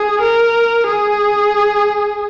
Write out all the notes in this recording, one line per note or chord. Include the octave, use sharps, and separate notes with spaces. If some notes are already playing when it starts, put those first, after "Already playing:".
Already playing: G#4
A#4
G#4